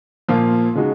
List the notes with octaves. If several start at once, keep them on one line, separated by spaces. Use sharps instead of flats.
A#2 F3 A#3 F4
C#3 G#3 D#4 F#4